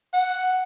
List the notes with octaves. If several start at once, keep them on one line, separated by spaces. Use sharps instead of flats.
F#5